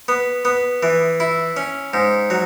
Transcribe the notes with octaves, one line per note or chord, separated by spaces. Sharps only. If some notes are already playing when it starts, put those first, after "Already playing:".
B3
B3
E3
E4
C#4
G#2
F#3